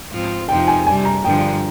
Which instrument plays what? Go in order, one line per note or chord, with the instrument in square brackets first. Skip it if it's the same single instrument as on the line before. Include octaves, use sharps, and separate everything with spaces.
[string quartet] G#2 F3 C4 F4
[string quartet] F2 C3 F3 C4 D#4 [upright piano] G5
[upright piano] G#5
[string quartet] C3 G3 D4 [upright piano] G#5
[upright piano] A#5
[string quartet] G2 D3 F3 [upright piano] G5